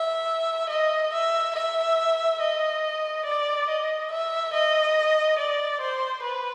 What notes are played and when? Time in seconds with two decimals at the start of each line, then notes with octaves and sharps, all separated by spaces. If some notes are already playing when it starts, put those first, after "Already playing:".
Already playing: E5
0.69 D#5
1.12 E5
1.55 E5
2.40 D#5
3.25 D5
3.68 D#5
4.10 E5
4.53 D#5
5.39 D5
5.81 C5
6.23 B4